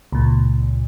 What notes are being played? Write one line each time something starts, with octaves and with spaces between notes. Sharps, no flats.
C#2 A#2